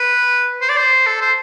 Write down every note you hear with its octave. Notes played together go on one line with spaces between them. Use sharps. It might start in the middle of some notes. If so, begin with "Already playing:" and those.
Already playing: B4
C5
D5
C5
A4
C5